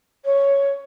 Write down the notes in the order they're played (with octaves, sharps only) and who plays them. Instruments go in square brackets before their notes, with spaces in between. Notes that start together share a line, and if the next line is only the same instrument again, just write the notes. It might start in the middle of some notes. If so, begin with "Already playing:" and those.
[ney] C#5